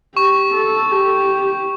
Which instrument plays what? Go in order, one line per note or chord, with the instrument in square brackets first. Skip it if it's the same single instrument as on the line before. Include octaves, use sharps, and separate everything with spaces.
[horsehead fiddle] G4 [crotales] C#6
[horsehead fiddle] A4
G4